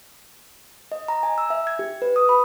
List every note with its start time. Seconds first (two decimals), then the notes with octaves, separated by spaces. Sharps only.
0.92 D#5
1.08 A#5
1.23 G#5
1.38 E6
1.50 E5
1.67 G#6
1.79 G4
2.02 B4
2.16 D#6
2.29 B5